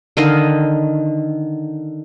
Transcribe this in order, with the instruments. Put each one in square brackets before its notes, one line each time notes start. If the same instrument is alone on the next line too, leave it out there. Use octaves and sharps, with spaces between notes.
[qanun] D3 D#3 D#5 F5